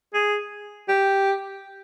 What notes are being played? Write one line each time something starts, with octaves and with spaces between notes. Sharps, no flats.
G#4
G4